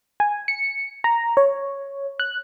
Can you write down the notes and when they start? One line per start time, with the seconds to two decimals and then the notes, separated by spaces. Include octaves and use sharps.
0.20 G#5
0.48 C#7
1.04 A#5
1.37 C#5
2.20 F#6